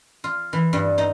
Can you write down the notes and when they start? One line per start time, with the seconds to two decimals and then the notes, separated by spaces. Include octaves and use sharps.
0.24 F4
0.53 E3
0.73 G2
0.98 D#4